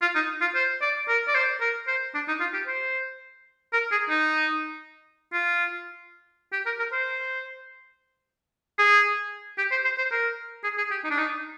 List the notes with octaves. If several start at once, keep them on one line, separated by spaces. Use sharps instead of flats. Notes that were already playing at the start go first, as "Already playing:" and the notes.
F4
D#4
F4
C5
D5
A#4
D5
C5
A#4
C5
D4
D#4
F4
G4
C5
A#4
G#4
D#4
F4
G4
A#4
A#4
C5
G#4
G4
C5
C5
C5
A#4
G#4
G#4
G4
D#4
D4
D#4